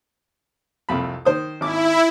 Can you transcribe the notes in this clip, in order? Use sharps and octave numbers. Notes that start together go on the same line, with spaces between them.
C2 F2 B5
D#3 C5 D#6
G#1 E4 D6